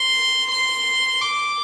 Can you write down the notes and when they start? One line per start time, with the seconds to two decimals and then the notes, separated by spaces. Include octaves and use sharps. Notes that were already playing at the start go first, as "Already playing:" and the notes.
Already playing: C6
0.51 C6
1.22 D6